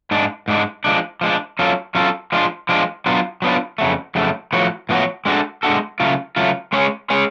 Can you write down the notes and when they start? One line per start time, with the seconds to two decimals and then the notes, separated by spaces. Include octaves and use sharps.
0.11 G#2 G#3 D4
0.48 G#2 G#3 D4
0.84 F3 G#3 D4
1.21 F3 G#3 D4
1.59 F#3 C#4 F4 A4
1.95 F#3 C#4 F4 A4
2.32 F3 G#3 D4 F4
2.69 F3 G#3 D4 F4
3.06 F#3 B3 D4 F4
3.42 F#3 B3 D4 F4
3.78 F2 C#3 F#3 A3
4.15 F2 C#3 F#3 A3
4.53 A2 F3 B3 F#4 C#5
4.89 A2 F3 B3 F#4 C#5
5.25 G#3 D4 F#4 A4
5.63 G#3 D4 F#4 A4
6.00 C#3 F#3 A3 F4
6.36 C#3 F#3 A3 F4
6.73 G#3 C#4 G#4 C#5
7.10 G#3 C#4 G#4 C#5